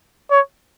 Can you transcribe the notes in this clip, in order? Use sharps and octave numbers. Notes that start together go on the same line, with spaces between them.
C#5